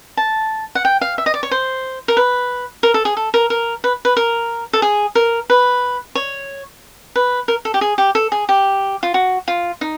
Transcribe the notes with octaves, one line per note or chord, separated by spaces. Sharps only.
A5
F#5
G5
F5
E5
D#5
D5
C#5
C5
A#4
B4
A#4
A4
G#4
A4
A#4
A#4
B4
B4
A#4
A4
G#4
A#4
B4
C#5
B4
A#4
A4
G4
G#4
G4
A4
G#4
G4
F4
F#4
F4
D#4